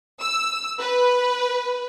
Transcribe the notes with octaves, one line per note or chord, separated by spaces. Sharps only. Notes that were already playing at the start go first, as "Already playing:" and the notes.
E6
B4